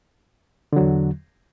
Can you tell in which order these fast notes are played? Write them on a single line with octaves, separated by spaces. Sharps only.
D3 F#3 E2